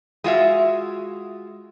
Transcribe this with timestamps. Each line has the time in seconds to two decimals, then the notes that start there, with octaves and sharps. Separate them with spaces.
0.24 G#3 F4 F#4 E5